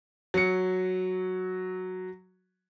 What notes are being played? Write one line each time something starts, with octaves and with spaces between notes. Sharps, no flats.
F#3 C#7